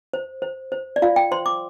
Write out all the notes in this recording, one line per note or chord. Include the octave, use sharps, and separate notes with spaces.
C5
C5
C5
D5
F4 F5
G5
C5 C6
D6